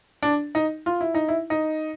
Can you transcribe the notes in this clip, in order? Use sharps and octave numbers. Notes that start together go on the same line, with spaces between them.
D4
D#4
F4
E4
D#4
E4
D#4